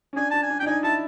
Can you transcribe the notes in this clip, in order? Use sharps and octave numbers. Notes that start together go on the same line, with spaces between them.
C#4
D4 G#5
D4 A5
G#5
D4
G5
D4
D#4 G#5
E4 A5